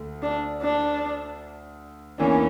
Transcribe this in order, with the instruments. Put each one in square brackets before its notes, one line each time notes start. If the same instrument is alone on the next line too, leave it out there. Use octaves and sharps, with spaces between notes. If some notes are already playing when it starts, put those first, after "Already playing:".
Already playing: [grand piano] D2 A3
[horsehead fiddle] D4
D4
[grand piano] E2 E3 A#3 D4 [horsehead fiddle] C#4